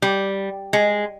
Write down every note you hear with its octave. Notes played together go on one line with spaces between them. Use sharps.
G3
G#3